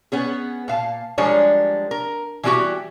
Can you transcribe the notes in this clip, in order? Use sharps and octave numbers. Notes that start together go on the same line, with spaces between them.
B3 C#4 G#4
A#2 F5 A5
F3 G3 G#3 D4 A#4 C#5
A#4
E3 G3 G#3 A#3 F#4 G4